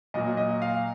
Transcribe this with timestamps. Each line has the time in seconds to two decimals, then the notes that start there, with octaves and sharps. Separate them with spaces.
0.14 A#2 F#3 A#3 D#5
0.37 D#5
0.62 F5